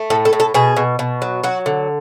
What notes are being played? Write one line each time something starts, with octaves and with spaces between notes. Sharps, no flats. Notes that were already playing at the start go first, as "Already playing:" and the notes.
Already playing: A3
A2 A4
A4
A2
A4
B2 G#4
B2
B2
F#3
F#3 F#4
D3